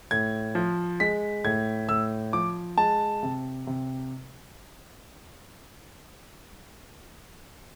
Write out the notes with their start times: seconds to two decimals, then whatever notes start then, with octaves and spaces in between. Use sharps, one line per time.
0.11 A2 G#6
0.55 F3
1.00 G#3 B6
1.44 A2 G#6
1.89 A2 E6
2.33 F3 D6
2.78 G#3 A5
3.23 C3
3.67 C3